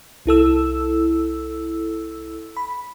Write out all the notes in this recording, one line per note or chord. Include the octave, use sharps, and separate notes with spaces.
C2 E4 A4 E6
B5